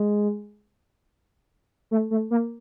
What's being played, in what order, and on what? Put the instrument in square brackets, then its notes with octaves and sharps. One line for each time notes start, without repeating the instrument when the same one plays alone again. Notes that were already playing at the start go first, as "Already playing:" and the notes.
Already playing: [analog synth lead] G#3
A3
A3
A#3